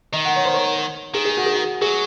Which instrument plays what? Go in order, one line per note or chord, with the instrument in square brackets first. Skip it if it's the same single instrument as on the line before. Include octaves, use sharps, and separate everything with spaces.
[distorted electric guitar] D#3 [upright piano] D#5
[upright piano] F#5
C#5
C5
C#5
[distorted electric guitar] D#3 [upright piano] G#4
[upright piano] G#4
F#4
G#4
F#4
[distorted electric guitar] F#3 [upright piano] G#4